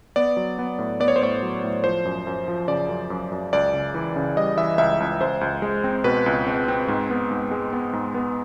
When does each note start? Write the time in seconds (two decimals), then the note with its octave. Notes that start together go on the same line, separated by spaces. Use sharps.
0.16 B3 D5
0.37 F#3
0.59 B3
0.79 A2
1.00 B3 D5
1.08 C#5
1.16 C5
1.22 A2 C#5
1.43 F#3
1.64 A2
1.84 F3 C5
2.05 F#2
2.27 F#2
2.48 F3
2.68 C#3 D5
2.89 F#2
3.10 F#2
3.32 F#2
3.53 C#2 D5
3.74 C#3
3.94 E3
4.16 C#3
4.37 G3 D#5
4.57 E3 E5
4.78 C#2 E5
5.00 C#2
5.21 C#2 C5
5.41 C#2
5.62 G#3
5.84 C4
6.04 B2 B4
6.26 C#2
6.47 C4
6.68 C4
6.88 G#2
7.10 B3
7.31 G#2
7.51 G#3
7.73 B3
7.93 G#2
8.14 B3